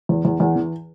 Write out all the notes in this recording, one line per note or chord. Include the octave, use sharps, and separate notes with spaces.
E2
E2
E2
E3